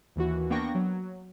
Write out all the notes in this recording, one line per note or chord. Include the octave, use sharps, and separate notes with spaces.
D#2 E3 F#4
A#3 B3 D4 G5 C#6 A#6
F#3